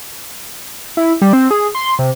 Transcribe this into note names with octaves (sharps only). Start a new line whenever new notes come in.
E4
G3
C4
G#4
C6
C3